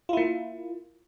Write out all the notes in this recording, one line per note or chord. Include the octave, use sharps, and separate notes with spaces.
A#3 E4 F4